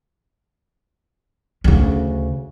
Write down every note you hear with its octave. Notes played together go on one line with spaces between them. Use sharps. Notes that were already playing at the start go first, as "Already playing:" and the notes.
D2 C#3